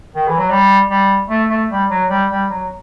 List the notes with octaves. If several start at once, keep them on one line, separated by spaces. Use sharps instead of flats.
D#3
E3
F#3
G3
G3
A3
A3
G3
F#3
G3
G3
F#3